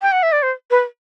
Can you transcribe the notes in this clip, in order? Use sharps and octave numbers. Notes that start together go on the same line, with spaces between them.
G5
F#5
E5
D5
C5
B4